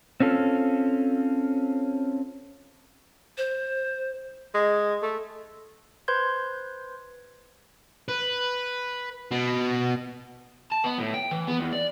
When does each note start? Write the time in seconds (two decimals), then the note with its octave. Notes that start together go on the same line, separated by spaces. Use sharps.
0.20 C4 C#4 F4 A4
3.38 C5
4.54 G#3
5.02 A3
6.08 B4 C5 C6 G6 G#6
8.08 B4
9.31 B2
10.72 A5
10.84 B3
10.99 A2
11.14 G5
11.31 E3
11.47 B3
11.60 E2
11.73 D5